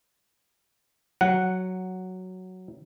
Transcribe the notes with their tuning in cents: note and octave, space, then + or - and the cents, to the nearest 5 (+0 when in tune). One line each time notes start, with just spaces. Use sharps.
F#3 +0 F#5 +0